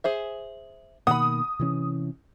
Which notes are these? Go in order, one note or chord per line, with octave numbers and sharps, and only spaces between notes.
G#4 C5 E5
B2 D#3 A#3 F#5 B5 D#6
C3 E3 C#4